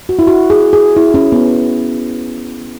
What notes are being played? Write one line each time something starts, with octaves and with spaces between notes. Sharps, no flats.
F#4
E4
F#4
G#4
G#4
E4
C#4
B3